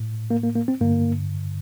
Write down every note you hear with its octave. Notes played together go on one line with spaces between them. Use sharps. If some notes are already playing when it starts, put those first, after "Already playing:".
Already playing: A2
A#3
A#3
A#3
C4
G2 D3 A#3